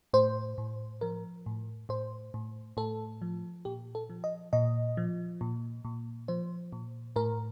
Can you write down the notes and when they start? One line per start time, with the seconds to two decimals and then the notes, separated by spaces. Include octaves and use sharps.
0.14 A2 C5
0.58 A2
1.01 F3 A#4
1.46 A2
1.89 A2 C5
2.34 A2
2.77 A2 A4
3.22 F3
3.65 A#2 G4
3.95 A4
4.10 F3
4.24 D#5
4.53 A#2 D#5
4.97 F3
5.41 A#2
5.85 A#2
6.28 F3 C5
6.72 A#2
7.16 A2 A#4